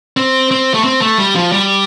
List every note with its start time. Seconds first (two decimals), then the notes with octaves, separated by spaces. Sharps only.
0.17 C4
0.51 C4
0.74 A3
0.84 C4
1.02 A3
1.18 G3
1.36 F3
1.52 G3